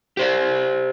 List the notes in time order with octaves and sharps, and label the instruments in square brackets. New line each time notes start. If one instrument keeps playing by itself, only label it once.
[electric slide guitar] G4 C5 D5